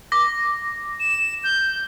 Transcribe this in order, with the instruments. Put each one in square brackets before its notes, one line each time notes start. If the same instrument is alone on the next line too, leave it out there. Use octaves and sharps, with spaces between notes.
[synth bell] D6 A#6
[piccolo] E7
G6